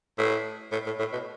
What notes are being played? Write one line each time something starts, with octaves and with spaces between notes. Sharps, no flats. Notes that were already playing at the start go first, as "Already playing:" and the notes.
A2
A2
A2
A2
B2